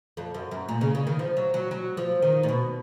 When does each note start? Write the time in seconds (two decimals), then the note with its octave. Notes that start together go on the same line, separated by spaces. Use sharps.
0.17 F2
0.34 F#2
0.51 F#2
0.69 A#2
0.81 C#3
0.95 C#3
1.07 D#3
1.19 F3
1.37 F#3
1.54 F#3
1.71 F#3
1.97 F3
2.22 D#3
2.43 A#2
2.49 B2